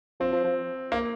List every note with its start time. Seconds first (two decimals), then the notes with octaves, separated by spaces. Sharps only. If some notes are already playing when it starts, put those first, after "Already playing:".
0.20 F3 C4
0.33 F3
0.44 F3
0.92 A#3